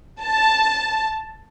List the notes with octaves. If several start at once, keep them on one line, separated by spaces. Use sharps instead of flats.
A5